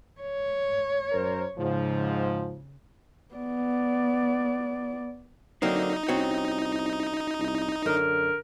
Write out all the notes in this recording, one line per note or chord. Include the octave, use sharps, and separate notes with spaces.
C#5
F#2 A#4 C5
G#2 C#3 F3
B3 D5
D3 F#3 A#3 C4 D#4
C2 C4 C#4 F#4
C2
F#2 D3 A#4